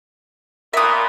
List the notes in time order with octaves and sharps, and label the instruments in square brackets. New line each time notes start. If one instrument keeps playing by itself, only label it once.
[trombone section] A#2 B3 [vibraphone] A#4 [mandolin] E5 D#6